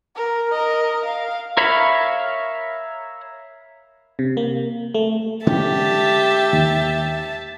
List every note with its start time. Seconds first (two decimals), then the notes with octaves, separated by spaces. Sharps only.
0.16 A#4
0.52 A#4 D#5
1.05 F5
1.57 A#4 C#5 E5 F5 B5
4.19 C3
4.37 A#3
4.94 A3
5.47 D3 G#3 C#4 G4 E5 A5
6.53 D#2